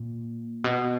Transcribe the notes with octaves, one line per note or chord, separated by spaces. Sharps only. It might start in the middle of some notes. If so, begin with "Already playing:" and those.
Already playing: A#2
B2